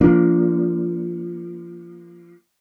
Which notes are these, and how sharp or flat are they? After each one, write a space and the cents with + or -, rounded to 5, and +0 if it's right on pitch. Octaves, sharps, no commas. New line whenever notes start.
F3 -20 A#3 +0 D4 -25